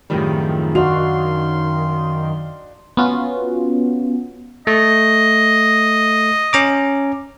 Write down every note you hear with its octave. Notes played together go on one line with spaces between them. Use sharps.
F#2 A2 D#3 F3 G3 C4 F4 G#4
D4 D#4 F#4 F5 C6 F7
B3 C#4 F4 F#4
A3 D#5
C#4 A#5 D6